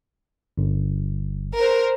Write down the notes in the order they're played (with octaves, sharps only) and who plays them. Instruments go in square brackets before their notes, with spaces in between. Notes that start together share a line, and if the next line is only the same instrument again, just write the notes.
[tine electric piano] G1
[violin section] A#4 C5